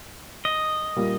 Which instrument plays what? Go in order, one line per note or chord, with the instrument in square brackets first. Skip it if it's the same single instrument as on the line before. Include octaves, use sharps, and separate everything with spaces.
[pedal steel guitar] D#5
[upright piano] A#2 G3 A#3